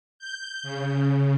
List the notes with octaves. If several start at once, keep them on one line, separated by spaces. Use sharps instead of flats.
G6
C#3